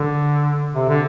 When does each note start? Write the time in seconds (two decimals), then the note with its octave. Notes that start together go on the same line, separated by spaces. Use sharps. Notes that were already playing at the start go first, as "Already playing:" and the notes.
Already playing: D3
0.74 C3
0.89 D3